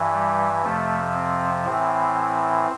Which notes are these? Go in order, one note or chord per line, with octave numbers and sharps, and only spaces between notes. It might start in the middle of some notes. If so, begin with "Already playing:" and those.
Already playing: G2 E3
G3
F2 C3 F3 A3
C4
A2 E3 C4